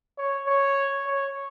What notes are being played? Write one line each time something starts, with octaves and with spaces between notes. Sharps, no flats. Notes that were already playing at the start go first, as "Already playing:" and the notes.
C#5
C#5
C#5